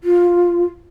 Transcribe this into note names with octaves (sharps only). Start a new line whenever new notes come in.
F4